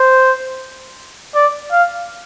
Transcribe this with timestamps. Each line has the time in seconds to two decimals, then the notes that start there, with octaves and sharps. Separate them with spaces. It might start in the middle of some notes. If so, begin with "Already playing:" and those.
Already playing: C5
1.35 D5
1.72 F5